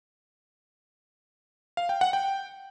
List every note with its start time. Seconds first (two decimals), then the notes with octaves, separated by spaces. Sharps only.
1.77 F5
1.89 G5
2.01 F#5
2.13 G5